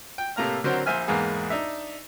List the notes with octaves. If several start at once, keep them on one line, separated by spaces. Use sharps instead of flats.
G5
A2 C3 A3 A#3 A#5 F6
D3 F#3 C4 F#4 A#4 C5
A#1 C5 E5 G#5 F6
E2 G#2 A#3 B3 G#4
D4 D#4 E5